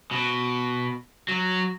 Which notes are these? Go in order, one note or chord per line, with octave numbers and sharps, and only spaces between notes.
B2
F#3